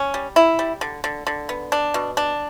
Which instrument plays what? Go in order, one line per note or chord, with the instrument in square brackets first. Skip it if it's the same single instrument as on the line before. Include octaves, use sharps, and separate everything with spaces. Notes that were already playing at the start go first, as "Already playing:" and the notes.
Already playing: [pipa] C#4
G3
E4
G3
D3
D3
D3
B3
D4
B2
D4